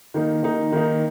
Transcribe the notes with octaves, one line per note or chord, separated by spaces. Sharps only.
D#3 A#3 D#4
D#3 A#3 D#4
D#3 A#3 D#4